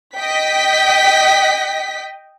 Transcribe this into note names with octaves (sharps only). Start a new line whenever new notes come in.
D#5 G5 B6